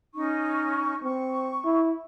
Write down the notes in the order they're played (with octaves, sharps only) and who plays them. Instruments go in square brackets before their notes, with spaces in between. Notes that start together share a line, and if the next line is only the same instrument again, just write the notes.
[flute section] C#4 D#4 C#6
[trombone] C4 [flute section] C#6
[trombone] E4